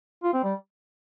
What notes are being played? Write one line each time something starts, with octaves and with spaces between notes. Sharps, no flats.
F4
C4
G3